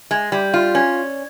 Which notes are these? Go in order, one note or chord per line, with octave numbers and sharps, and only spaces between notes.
G#3
G3
F4
C#4